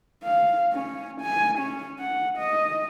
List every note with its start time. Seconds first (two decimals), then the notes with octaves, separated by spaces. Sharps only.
0.24 F5
0.73 C#4
1.21 G#5
1.59 C#4
1.99 F#5
2.38 D#5